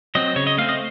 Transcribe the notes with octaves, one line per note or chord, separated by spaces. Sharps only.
F#3 C4 D#5
C#3 C#5
D#5
A3 C4 F5
D#5